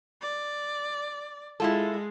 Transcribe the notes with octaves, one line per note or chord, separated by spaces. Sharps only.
D5
G#3 E4 F4 A4